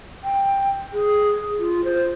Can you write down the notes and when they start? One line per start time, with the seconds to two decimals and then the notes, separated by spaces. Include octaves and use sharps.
0.24 G5
0.93 G#4
1.60 F4
1.84 C5